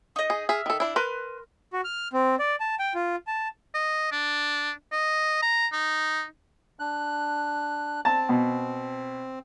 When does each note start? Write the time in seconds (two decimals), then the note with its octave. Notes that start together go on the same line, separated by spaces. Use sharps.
0.16 D#4 D#5
0.30 G#4
0.49 G#4 E5 E6 F6
0.66 D#3 A4
0.80 D4 E4
0.96 A#4 B4 C6
1.73 F#4
1.84 F6
2.13 C4
2.39 D5
2.60 A5
2.79 G5
2.95 F4
3.27 A5
3.74 D#5
4.12 D4
4.92 D#5
5.42 A#5
5.73 D#4
6.80 D4 F#6
8.05 C4 A5
8.29 B2